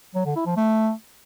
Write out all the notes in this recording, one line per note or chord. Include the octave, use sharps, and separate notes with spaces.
F#3
D3
E4
F3
A3